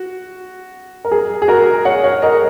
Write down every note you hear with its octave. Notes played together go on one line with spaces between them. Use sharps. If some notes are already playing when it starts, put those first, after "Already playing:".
Already playing: F#4
A#4
G#4
G#4
F#4 A#4
C#5 F#5
C#5 F#5
A#4 D#5